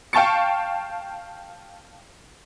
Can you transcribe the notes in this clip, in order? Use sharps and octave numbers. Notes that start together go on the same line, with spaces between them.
F5 G5 A5 C#6 A6 C#7